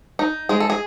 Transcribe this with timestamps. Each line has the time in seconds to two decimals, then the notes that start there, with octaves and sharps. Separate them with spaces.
0.19 D#4
0.49 G#3 G#4
0.60 A4
0.70 G#4